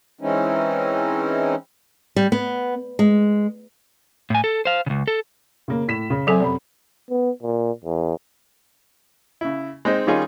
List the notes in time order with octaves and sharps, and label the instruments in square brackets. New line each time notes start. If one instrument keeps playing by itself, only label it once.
[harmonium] E3 G#3 C4 C#4 D#4 E4
[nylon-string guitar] G3
B3
G#3
[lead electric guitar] A2 G#5
A4
C5 F5
C#2 C#3
A4
[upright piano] C#3 A#3
A2 B6 E7
C#3
[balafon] F#3 A4 [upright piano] C4 E5 G#5
[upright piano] F#2 C3 B5
[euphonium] B3
A#2
E2
[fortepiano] C#3 E4
G#3 C4 D#4 C5
D#3 G3 C#4 D#4 F4 G#4